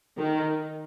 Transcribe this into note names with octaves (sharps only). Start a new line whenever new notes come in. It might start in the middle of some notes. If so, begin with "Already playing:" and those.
D#3